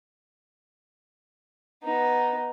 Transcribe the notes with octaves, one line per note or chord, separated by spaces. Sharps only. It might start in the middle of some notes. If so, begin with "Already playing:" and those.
B3 D#4